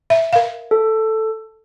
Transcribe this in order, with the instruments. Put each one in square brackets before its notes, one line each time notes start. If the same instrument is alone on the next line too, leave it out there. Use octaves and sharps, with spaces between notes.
[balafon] E5
A#4 F5
[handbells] A4